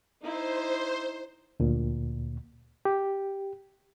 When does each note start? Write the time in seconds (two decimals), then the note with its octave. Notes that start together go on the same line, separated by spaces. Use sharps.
0.21 D#4 E4 C5
1.60 D2 A#2
2.85 G4